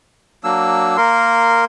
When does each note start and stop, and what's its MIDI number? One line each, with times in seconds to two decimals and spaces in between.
0.44 0.97 54
0.44 0.97 58
0.44 0.97 62
0.44 0.97 88
0.97 1.65 58
0.97 1.65 70
0.97 1.65 84